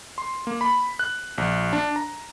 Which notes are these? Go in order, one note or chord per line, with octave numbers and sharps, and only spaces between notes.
C6
A#3
B5
F#6
A#1
D4
A#5